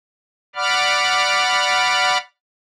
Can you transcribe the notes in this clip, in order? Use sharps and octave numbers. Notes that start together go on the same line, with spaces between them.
D5 F#5 B5 D6 F6